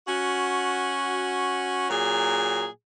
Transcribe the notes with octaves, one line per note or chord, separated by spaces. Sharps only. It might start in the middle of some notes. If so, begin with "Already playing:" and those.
C#4 F#4
A#2 F#3 G#4